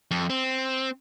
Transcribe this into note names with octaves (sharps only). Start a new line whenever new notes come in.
F2
C4